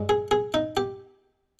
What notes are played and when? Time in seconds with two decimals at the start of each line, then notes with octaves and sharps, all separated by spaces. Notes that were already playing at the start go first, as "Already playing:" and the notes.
Already playing: G2 G#3
0.09 G#4
0.31 G#4
0.54 D#4
0.77 G4